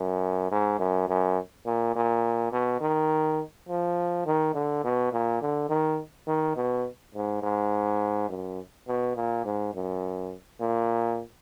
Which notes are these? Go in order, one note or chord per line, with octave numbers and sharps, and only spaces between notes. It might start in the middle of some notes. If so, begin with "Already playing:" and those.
Already playing: F#2
G#2
F#2
F#2
A#2
A#2
B2
D#3
F3
D#3
D3
B2
A#2
D3
D#3
D#3
B2
G#2
G#2
F#2
B2
A#2
G#2
F#2
A#2